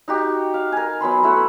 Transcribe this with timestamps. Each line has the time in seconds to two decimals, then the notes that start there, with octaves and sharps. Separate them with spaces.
0.08 D#4 F#4 G4
0.54 F5
0.72 A#4 G#5
1.00 F#3 B3 B5 C6
1.23 A3 E4 B4 F#5